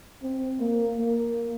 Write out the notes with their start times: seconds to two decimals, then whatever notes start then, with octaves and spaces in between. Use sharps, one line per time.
0.23 C4
0.60 A#3
0.98 A#3